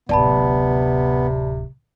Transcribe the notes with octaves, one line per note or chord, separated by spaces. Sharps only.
D1 A1 C3 B3 D5 A5 B5